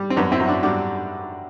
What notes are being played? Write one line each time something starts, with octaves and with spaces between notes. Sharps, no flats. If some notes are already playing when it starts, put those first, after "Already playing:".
Already playing: G3
C4
F#2 B3 D4
C4 E4
F#2
D4 F#4
G3 D4 F#4